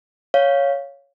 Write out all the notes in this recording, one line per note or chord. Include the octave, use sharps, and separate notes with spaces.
C#5 F5